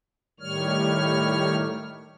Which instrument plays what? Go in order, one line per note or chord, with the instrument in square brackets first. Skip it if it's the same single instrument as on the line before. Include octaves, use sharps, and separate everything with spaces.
[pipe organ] A2 D#3 G3 C#5 F6